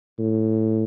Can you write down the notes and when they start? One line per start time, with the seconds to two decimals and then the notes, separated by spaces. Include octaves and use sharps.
0.18 A2